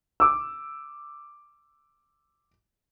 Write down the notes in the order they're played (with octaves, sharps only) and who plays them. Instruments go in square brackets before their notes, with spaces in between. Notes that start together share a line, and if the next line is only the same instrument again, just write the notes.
[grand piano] D6 E6